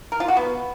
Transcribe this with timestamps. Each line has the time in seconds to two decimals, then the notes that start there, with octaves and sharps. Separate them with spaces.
0.12 A#4
0.20 F4
0.28 F#4
0.37 B3